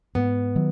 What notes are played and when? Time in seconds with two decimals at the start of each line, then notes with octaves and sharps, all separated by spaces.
0.15 G#2 B3
0.56 D#3 F#3